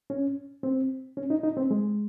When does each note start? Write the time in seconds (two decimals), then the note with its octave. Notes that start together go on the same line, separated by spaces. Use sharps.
0.10 C#4
0.63 C4
1.17 C#4
1.30 D#4
1.43 D#4
1.57 C4
1.71 G#3